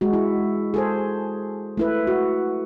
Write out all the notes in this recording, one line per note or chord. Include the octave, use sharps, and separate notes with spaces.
G#3 F#4
E4
G#4 A4 C5
A3 E4 B4
F#4